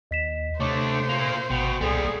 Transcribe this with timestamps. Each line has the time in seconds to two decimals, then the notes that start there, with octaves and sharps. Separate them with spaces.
0.11 D#2 D#5 B6 E7
0.60 C3 A3 D4 C5 C#5 C#6 D6
1.09 A#3 F4 F7
1.50 G#1 B2 G5 F7
1.81 C2 A#2 G3 G#4 A4